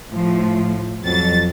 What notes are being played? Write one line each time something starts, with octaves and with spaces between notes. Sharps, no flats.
A2 F3
F2 F#3 A6